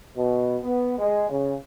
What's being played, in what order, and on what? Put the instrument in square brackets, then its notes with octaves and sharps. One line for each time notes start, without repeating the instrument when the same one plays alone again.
[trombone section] B2
B3
G#3
C#3